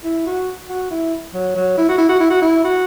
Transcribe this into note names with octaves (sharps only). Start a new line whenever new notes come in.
E4
F#4
F#4
E4
F#3
F#3
E4
F#4
E4
F#4
E4
F#4
E4
F#4